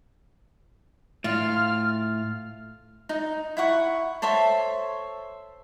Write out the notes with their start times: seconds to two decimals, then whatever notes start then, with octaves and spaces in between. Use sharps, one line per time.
1.24 A2 F4 F6
3.09 D#4
3.57 E4 F#5 C#6
4.22 A4 C5 C#5 E5